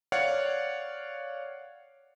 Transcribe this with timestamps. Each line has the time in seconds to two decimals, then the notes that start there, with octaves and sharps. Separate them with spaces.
0.12 C#5 D5 F5 F#5